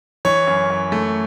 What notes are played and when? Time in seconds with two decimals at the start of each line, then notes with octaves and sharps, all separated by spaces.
0.25 E3 C#5
0.47 F#2
0.70 F#2
0.92 A3